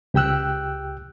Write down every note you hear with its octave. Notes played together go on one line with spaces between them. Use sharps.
C#2 G4 G5 E6 F#6